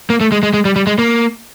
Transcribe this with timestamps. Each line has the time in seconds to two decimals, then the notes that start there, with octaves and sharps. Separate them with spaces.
0.10 A#3
0.21 A3
0.32 G#3
0.43 G#3
0.54 G#3
0.65 G3
0.76 G3
0.87 G#3
0.99 A#3